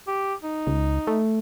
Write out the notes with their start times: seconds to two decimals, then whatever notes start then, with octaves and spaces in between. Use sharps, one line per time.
0.07 G4
0.43 D#4
0.67 C#2
1.07 A3